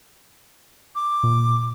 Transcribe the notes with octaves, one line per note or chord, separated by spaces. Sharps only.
D6
A#2